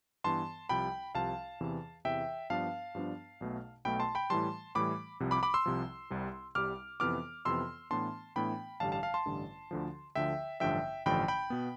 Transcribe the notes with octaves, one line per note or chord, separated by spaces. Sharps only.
G2 E3 B3 A5 C6
C2 C3 F3 G5 B5
C2 C3 F3 F5 A5
E2 C3 E3
E2 C3 E3 E5 G5
G2 F3 B3 D4 F5 A5
G2 F3 B3 D4
B1 B2 A3
B1 B2 A3 G5 B5
A5 C6
G5 B5
A2 E3 G3 A5 C6
A2 E3 G3 B5 D6
C2 C3 F3
B5 D6
B5 D6
C6 E6
C2 C3 F3
C2 C3 G3
C2 C3 G3 D6 F6
F2 C3 E3 B3 D6 F6
F2 C3 E3 B3 C6 E6
A2 E3 B3 D4 A5 C6
A2 E3 B3 D4 G5 B5
A1 G2 D3 G3 F5 A5
F5 A5
F5 A5
A5 C6
A1 G2 D3 G3
D2 D3 F3
D2 D3 F3 E5 G5
A1 G2 D3 F3 E5 G5
A1 G2 D3 F3 G5 B5
G5 B5
B2 B3